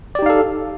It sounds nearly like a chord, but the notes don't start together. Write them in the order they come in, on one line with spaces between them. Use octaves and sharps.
D5 G4 D#4 F5 A4